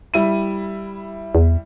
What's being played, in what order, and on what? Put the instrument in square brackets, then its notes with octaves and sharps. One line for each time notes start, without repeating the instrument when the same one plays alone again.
[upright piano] G3 E4 D#7
[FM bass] E2